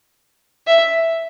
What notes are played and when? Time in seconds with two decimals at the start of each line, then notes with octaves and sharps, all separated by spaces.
0.67 E5